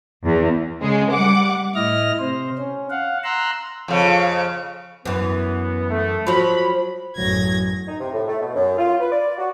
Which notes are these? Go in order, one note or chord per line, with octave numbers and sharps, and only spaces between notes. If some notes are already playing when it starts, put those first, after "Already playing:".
E2
C#3 G#3 G#4
G3 F#5 D6
A2 E4 D#5 F6 A#6
C3 C5
C#4
F5 F#5
A#5 C6 E6 F#6
F2 C#3
F#2 E3 B3
A3
F3 F#3 B5
A1 F#2 F#3 G#6 A#6
D#4
C3
A2
A3
B2
F#2
F4
B4
D5
F#4